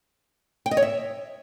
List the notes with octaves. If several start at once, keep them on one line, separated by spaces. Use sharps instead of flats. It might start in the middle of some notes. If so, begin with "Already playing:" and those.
G5
D#5
C#5
E5